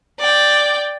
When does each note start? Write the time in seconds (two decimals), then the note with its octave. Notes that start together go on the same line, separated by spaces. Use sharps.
0.20 D5 G5